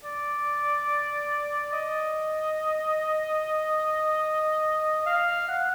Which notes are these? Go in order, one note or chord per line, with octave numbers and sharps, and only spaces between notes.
D5
D#5
F5
F#5